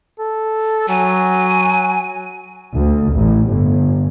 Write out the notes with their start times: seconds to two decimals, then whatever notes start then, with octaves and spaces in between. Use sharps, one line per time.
0.20 A4
0.89 F#3 G#5
2.76 D2
3.14 A1
3.50 G1